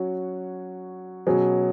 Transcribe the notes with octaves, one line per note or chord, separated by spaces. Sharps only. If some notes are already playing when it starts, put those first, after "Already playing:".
Already playing: F#3 C#4 F#4 C#5
B2 F#3 C#4 G#4